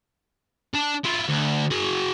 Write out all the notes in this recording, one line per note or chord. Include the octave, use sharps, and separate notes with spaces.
D4 A5
E4 F4
D2
F#4 G#4